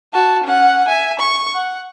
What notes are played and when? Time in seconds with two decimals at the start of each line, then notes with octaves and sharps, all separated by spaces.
0.13 F#4 A5
0.44 C#4 F#5
0.88 E5 G#5
1.20 C#6
1.54 F#5